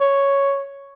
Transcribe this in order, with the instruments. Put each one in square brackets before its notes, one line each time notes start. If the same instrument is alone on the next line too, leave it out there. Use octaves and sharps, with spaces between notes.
[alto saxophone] C#5